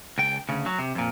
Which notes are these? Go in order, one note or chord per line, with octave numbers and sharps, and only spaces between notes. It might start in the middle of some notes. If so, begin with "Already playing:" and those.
C#2 G5
D2 C#3
F#3
C3
F2 A#2